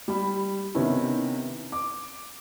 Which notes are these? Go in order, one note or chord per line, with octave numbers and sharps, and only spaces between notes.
G3 B5
C3 D#3 B3 C#4 E4
D6